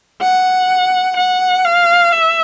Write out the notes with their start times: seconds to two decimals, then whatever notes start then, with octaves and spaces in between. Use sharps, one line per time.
0.22 F#5
1.17 F#5
1.64 F5
2.13 E5